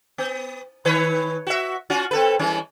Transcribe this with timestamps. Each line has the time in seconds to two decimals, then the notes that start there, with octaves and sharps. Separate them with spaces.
0.18 B3
0.85 D#3 B4 C#5
1.47 F#4 E5
1.90 C#4 F4 F#4
2.11 C4 A4 B4
2.39 E3 G3 C#4